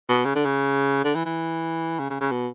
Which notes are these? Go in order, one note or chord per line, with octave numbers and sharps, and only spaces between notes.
B2
C#3
D3
C#3
D3
E3
E3
C#3
C#3
C#3
B2